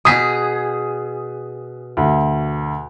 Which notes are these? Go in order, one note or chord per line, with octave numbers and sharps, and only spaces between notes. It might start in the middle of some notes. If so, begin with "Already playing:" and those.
B2 G#4 D#6 B6
D2